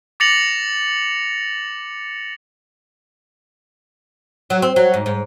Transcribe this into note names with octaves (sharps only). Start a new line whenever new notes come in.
D6 A6 A#6 C#7 F7 F#7
F#3
C4
F#3
G#2
G#2